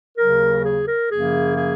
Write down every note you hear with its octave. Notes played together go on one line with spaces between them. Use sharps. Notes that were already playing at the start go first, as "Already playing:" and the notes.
D#2 C#3 F#3 A#4
G#4
A#4
F#2 C#3 F3 A#3 G#4
G#4